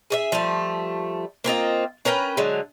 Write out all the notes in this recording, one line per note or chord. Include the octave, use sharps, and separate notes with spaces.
G#4 D5 E5
F3 G3 A3
A#3 C4 F4 D#5
C#4 A#4 B4 G5
D3 F#3 G#3